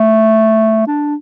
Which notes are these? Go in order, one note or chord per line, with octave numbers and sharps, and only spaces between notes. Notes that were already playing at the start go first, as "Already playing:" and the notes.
Already playing: A3
D4